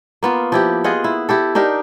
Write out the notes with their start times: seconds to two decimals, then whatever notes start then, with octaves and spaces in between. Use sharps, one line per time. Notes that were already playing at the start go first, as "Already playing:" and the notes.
0.23 A#3 B3 F4
0.52 F3 E4 G4
0.84 F4 G#4 D#5 F#5
1.04 E4
1.29 E4 G4 A4
1.55 D4 D#4 G4 A#4